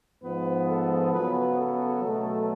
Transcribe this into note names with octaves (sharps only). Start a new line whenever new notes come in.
G#2 F3 B3 B4
A4
C#3 F#3 B3 B4
A4
B2 F#3 A3